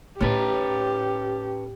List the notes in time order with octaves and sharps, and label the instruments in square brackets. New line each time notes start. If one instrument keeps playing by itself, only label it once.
[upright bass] A2 D#4 [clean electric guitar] C#4 A4 B4 [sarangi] G4